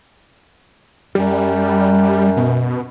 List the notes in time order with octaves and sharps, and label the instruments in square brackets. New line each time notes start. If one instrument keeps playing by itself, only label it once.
[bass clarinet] F#2 [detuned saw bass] G3
[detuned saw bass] B2